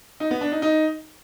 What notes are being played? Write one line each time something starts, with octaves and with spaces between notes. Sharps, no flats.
D#4
B3
D4
D#4
D#4